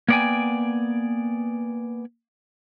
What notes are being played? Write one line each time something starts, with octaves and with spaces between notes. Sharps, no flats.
A#3 B3 D5 F5 G5 G#5